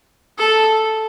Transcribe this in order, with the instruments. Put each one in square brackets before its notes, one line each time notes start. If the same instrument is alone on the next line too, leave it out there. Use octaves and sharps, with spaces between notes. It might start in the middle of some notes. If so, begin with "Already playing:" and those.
[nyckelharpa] A4